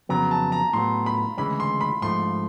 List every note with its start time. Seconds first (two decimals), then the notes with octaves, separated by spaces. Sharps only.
0.09 F2 C#3 F#3 B3 A#5
0.31 A5
0.52 A#5
0.73 A2 F#3 B3 C6
1.06 B5
1.37 D2 C#3 E3 G#3 C#4 B5
1.60 C6
1.81 B5
2.01 G#2 F3 A3 C6